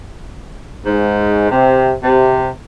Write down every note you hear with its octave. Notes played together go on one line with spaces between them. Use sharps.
G#2
C3
C3